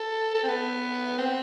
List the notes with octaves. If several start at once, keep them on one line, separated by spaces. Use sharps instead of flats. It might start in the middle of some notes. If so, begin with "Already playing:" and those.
Already playing: A4
A4
C4
B3
C4